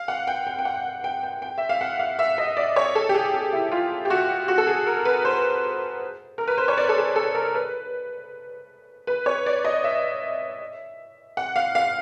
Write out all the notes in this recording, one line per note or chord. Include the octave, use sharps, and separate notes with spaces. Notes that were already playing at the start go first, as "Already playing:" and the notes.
Already playing: F5
F#5
G5
G5
G5
F#5
G5
G5
G5
E5
F5
F#5
F5
E5
D#5
D5
C#5
A4
G4
G#4
G#4
E4
F4
G4
F#4
F#4
A4
G#4
A#4
B4
C5
A#4
B4
C5
C#5
D5
A4
G#4
A4
A#4
B4
B4
C#5
D5
D#5
E5
F#5
F5
F5